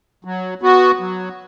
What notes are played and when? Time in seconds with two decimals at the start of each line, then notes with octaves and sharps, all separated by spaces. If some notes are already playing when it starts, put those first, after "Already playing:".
0.25 F#3
0.62 B3 F#4
0.99 F#3